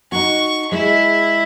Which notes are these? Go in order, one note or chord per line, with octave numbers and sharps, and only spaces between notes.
D#4 F#4 C#6
G#3 E4